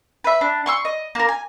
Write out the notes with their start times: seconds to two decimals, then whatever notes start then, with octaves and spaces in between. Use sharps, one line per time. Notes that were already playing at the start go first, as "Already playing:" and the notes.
0.24 B4 E5
0.41 D4
0.66 C6 C#6 E6
0.85 D#5
1.15 A#3 A#4
1.29 G#5